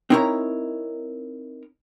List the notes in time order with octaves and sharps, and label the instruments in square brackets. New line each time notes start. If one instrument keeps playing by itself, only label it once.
[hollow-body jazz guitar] C4 D#4 E4 A#4 C#5 A#5